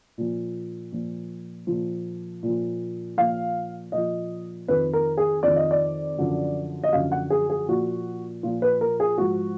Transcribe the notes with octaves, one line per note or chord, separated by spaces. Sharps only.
A#2 F3
A#2 F3
A#2 F3
A#2 F3
A#2 F3 F5
A#2 F3 D#5
F2 D#3 B4
A#4
G#4
F2 D#3 D5
D#5
D5
F#2 D3 F3
D#5
F#2 D3 F3 F5
F#5
G#4
G#4
A#2 F3 F#4
A#2 F3 F4
B4
A#4
G#4
G#2 F3 F#4